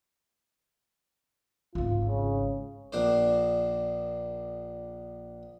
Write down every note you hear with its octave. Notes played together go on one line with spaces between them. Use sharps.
G#1 D#4 F4
C#3
A#1 D4 C5